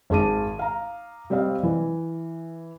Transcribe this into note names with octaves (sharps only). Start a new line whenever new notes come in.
G#1 G#4 A5 D6 D#7
F5 A#5
G3 C4 D5 D#5 F5
E3